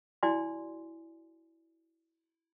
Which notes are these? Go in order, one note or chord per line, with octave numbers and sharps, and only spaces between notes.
E4 F#4 D5 G#5 C6